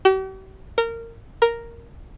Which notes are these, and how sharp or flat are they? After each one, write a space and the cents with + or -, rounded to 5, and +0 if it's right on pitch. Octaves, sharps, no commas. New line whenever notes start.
G4 -45
A#4 -20
A#4 +0